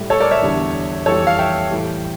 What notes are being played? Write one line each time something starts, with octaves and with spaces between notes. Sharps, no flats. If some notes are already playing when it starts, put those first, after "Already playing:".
Already playing: A2 G3
A4 C#5
A#4 D5
C#5 E5
E2 D3 G3
F2 E3 G3 A4 C#5
F5
E5 G5
A2 E3 G3